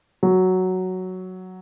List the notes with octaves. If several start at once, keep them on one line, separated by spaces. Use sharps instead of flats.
F#3